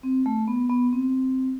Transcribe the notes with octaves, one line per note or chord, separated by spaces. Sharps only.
C4
A3
B3
B3
C4